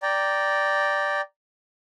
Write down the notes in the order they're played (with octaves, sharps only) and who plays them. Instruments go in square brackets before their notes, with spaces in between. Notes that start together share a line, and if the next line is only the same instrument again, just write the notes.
[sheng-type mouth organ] D5 G5 A#5